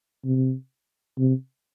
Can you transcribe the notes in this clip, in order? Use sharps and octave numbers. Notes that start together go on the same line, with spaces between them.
C3
C3